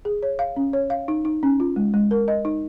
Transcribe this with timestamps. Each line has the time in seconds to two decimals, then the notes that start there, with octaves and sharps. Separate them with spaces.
0.05 G#4
0.23 C#5
0.39 F5
0.56 C#4
0.73 C#5
0.90 F5
1.08 D#4
1.25 D#4
1.43 C#4
1.60 F4
1.76 G#3
1.94 G#3
2.11 A#4
2.28 D#5
2.45 D#4